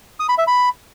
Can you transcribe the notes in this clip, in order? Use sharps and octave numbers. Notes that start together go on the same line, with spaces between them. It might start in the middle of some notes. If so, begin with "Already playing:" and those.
D#6
B5
E5
B5